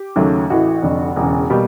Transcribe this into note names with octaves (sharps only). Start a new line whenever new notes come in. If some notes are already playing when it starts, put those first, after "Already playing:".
Already playing: G4
D#2 C#3 F#3 A3
A1 A2 E3 F#4
F1 F2 D3
E1 E2 C#3
B2 G3 A#3 G4